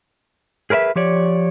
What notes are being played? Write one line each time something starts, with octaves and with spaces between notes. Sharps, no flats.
G#4 A#4 B4 D5 E5
F3 G4 C#5 D5